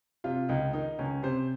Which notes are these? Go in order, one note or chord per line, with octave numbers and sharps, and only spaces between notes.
C3 F4
C#2 D#4
D#3 D#4
C#2 C#4
C3 C5